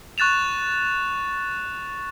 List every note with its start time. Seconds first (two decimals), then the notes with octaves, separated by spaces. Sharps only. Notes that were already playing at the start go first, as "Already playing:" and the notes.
0.18 C#6 F#6 A6 E7 F7